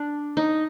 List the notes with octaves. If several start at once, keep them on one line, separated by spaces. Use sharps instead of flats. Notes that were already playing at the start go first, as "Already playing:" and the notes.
Already playing: D4
D#4